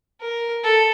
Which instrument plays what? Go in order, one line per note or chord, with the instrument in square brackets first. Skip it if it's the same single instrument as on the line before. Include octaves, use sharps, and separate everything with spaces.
[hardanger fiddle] A#4
A4